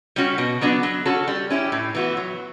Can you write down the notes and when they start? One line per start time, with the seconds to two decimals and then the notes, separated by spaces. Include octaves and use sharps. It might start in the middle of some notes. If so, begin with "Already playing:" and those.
0.16 G3 C#4 F#4
0.38 B2
0.61 F#3 B3 D4 F#4
0.83 F#3
1.06 C#4 F#4 A4
1.28 G3
1.50 C#4 E4 G4
1.72 A2
1.95 E3 B3 F#4
2.17 F#3